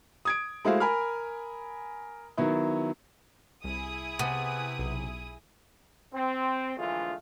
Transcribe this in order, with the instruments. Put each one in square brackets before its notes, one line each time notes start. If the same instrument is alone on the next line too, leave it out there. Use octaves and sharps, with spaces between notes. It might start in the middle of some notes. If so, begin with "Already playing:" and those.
[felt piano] D#6 G#6 D7
G#3 A3 E4 F#4 C5 F5
A#4 G#5 B5 F6
D#3 F#3 B3 E4
[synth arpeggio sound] C2 [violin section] E4 G#4 D#6
[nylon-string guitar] C3 [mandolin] B3
[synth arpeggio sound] B1
[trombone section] C4
A#1 D3 E3 G#3 A3 F4